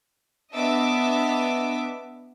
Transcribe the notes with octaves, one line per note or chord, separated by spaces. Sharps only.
B3 D4 D#5 E5 D6 E6